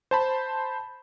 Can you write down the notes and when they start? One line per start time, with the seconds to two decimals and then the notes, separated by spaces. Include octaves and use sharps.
0.11 C5 A5 B5